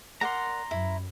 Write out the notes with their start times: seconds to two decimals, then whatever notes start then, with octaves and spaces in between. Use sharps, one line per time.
0.21 A#4 D5 F#5 A#5 C6
0.71 F#2 E4